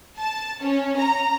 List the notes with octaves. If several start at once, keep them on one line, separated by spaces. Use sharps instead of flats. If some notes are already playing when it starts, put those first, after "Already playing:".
A5
C#4
A#5